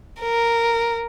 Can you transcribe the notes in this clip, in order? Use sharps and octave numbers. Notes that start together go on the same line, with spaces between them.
A#4